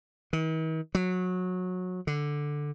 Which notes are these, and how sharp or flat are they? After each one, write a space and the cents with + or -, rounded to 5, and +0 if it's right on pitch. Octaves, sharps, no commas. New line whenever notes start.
D#3 +45
F#3 -20
D3 +0